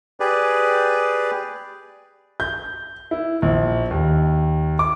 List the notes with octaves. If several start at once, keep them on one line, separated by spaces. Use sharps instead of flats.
G4 G#4 B4 D5
G6
E4
A#1
D#2
D6